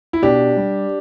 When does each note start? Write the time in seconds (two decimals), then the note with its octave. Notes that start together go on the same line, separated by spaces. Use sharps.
0.13 E4
0.22 B2 D4 G4
0.57 G3